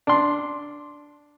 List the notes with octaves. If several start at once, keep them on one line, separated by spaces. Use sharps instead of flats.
D4 C6